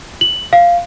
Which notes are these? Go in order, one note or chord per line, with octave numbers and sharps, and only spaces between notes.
F#7
F5